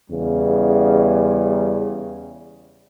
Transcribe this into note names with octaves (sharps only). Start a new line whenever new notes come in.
E2 C#3 G3